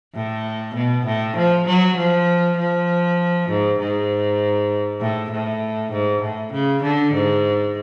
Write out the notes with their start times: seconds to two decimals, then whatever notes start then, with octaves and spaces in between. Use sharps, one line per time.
0.14 A2
0.75 B2
1.06 A2
1.36 F3
1.66 F#3
1.97 F3
2.57 F3
3.48 G#2
3.79 G#2
5.01 A2
5.31 A2
5.92 G#2
6.22 A2
6.53 C#3
6.83 D3
7.14 G#2